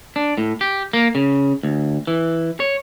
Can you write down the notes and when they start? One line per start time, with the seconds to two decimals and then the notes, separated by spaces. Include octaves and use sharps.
0.16 D4
0.38 A2
0.61 G4
0.93 A#3
1.15 C#3
1.63 D2
2.07 E3
2.60 C#5